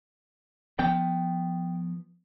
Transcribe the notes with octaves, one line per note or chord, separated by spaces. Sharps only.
F3 B3 G5